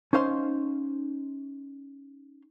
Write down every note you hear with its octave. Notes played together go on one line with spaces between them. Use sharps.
C#4 D#4 C5 F5 C6